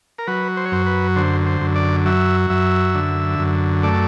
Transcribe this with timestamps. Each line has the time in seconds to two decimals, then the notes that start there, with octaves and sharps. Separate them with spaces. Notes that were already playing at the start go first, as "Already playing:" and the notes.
0.18 A#4
0.27 F#3 B4
0.57 C5
0.65 C#5
0.72 F#2 C5
0.86 B4
1.16 D3 C5
1.46 C5
1.61 F#2
1.75 D5
2.05 F#3 E5
2.50 F#2 E5
2.95 D3
3.39 F#2
3.83 A3 D5